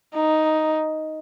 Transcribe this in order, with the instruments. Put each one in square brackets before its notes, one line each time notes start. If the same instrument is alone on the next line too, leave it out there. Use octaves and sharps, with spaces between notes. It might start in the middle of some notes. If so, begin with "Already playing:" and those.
[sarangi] D#4